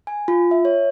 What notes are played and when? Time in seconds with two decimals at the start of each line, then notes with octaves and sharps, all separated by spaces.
0.07 G#5
0.28 F4
0.51 E5
0.65 C#5